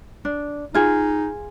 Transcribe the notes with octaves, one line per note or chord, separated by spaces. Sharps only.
D4
D#4 F4 G#4